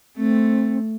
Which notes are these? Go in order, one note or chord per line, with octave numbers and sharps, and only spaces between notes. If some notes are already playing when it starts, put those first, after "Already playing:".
A3 C4